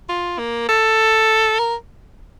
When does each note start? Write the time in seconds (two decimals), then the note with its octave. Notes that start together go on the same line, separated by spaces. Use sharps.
0.09 F4
0.38 A#3
0.69 A4
1.59 A#4